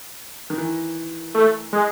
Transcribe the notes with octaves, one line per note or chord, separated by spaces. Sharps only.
D#3
E3
A3
G#3